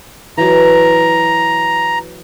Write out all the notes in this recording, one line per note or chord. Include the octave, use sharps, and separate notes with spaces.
E3 F#3 A#5